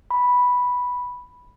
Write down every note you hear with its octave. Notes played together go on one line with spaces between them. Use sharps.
B5